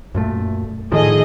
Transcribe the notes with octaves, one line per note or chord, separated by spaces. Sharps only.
F#2 A#2 A3
A2 D#3 F3 G#4 A4 D#5